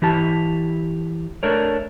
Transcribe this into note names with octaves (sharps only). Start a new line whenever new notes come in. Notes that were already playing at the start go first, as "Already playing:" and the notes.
E3 E4 G4 A5
A3 D4 A#4 C#5